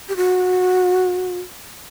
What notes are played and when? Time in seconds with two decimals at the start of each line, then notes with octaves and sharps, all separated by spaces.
0.09 G4
0.16 F#4